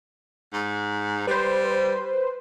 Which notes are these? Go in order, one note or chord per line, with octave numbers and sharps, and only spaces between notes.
G#2
G3 B4 C5